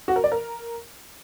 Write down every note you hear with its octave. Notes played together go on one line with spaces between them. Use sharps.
F#4
A#4
D5
A#4